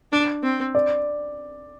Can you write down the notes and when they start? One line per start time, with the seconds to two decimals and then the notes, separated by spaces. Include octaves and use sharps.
0.12 D4
0.43 C4
0.75 D5